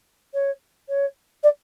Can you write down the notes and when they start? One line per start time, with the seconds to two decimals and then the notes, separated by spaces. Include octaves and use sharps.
0.34 C#5
0.89 C#5
1.43 D5